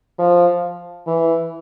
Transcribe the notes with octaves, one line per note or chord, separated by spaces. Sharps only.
F3
E3